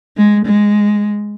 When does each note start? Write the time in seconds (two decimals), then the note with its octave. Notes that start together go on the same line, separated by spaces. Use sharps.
0.17 G#3
0.46 G#3